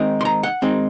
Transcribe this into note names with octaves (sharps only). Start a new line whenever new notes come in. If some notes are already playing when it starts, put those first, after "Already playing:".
Already playing: D#3 G#3 C4 D#4
C6
A#5
F#5
D#3 G#3 C4 D#4